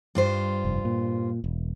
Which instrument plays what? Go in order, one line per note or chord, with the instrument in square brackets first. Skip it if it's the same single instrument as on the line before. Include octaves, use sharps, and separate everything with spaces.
[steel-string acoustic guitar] G2 F4 C5
[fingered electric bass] F1
A#2
E1